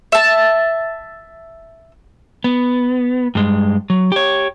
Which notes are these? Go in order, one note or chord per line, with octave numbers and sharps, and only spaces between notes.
E5 A5
B3
G2 G#3
F#3
G4 C#5